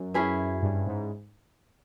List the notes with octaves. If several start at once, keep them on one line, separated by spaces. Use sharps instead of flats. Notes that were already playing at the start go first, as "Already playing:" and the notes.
Already playing: F#2
C#4 E4 G#4 B4
G2
G#2